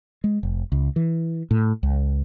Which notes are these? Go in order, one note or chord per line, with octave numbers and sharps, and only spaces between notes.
G#3
F1
C#2
E3
A2
C#2